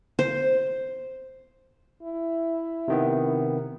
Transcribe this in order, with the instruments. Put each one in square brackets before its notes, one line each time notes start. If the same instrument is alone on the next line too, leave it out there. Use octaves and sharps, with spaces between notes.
[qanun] C5
[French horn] E4
[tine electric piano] C3 D#3 B3